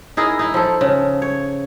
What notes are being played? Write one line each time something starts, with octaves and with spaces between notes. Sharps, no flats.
D#4 E4 G#4 A#4
D#4 E4
F3 A4
C#3
C#5